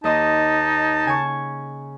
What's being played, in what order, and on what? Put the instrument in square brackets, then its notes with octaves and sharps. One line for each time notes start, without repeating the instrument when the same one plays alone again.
[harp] D#2 D#5 C6 [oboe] D#4 [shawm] A5
[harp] C#3 G#5 C#6